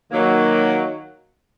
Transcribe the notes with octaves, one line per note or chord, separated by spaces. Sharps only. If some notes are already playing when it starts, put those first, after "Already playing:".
D#3 F#3 A#3